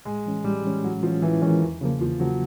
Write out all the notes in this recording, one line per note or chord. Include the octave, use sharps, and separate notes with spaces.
A2 G#3
E3 G#3 C#4
A2 G3
E3 G#3 C#4
A2 F#3
E3 F3 G#3 C#4
A2 E3
D#3 E3 G#3 C#4
E2
C#3 F3 A#3
E2 F3
C#3 F3 F#3 A#3